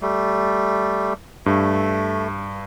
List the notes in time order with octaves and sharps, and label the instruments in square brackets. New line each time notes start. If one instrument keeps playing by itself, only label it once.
[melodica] G3 A3
[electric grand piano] G2 [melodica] A3